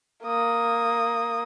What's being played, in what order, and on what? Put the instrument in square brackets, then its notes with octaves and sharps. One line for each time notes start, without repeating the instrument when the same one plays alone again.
[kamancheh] A#3 D#6